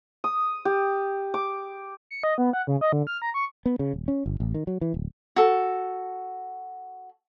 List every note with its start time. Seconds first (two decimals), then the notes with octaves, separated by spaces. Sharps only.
0.24 D#6
0.65 G4
1.34 D6
2.11 C#7
2.23 D#5
2.38 B3
2.53 F#5
2.67 C#3
2.81 D#5
2.92 D3
3.07 F6
3.22 A#5
3.34 C#6
3.66 B3
3.79 C#3
3.93 D#1
4.08 C#4
4.26 G1
4.40 A1
4.54 D#3
4.67 F#3
4.81 E3
4.94 D1
5.36 F#4 A4